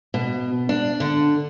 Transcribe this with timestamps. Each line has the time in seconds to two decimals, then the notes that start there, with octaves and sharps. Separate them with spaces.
0.14 B2
0.69 D4
1.00 D3